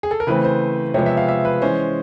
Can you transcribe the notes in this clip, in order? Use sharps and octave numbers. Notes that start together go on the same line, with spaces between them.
G#4
A4
A#4
C#3 E3 A3 C4 B4
C5
C3 F3 G#3 B3 C#5
E5
F5
E5
B4
E3 G#3 C#4 C5